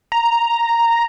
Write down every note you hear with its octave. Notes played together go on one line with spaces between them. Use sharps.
A#5